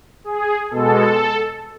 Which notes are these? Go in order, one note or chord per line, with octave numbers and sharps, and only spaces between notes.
G#4
B2 G#3 A4